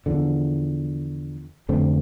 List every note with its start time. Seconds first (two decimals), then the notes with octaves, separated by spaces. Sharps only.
0.06 E2 D3 F3
1.69 F2 D3 A3 C4